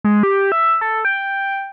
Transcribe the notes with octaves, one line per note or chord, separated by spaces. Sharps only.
G#3
G4
E5
A4
G5